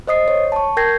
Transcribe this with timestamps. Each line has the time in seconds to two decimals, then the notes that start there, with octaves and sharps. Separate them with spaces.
0.07 C5 D#5 D#6 C7
0.28 C#5
0.52 A5 C#6
0.77 A#4 G5 G6 G#6 A#6 C7